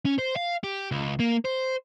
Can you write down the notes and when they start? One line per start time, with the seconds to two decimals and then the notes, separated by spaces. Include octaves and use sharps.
0.05 C#4
0.18 C5
0.36 F5
0.64 G4
0.91 C#2
1.20 A#3
1.45 C5